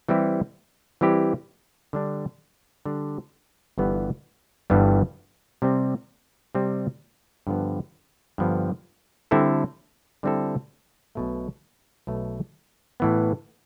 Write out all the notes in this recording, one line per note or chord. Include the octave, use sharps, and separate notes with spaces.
E3 G3 C4 E4 G4
E3 G3 C4 E4 G4
D3 G3 D4
D3 G3 D4
G1 G2 E3 G3 B3
G1 G2 E3 G3 B3
C3 G3 C4
C3 G3 C4
G2 D3 F3 B3
G2 D3 F3 B3
D3 G3 C4 E4 A4
D3 G3 C4 E4 A4
B1 B2 A3
B1 B2 A3
A2 E3 B3